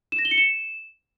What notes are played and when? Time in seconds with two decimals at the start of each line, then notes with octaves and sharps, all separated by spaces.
0.12 E7
0.19 A#6
0.25 G7
0.31 C#7
0.38 E7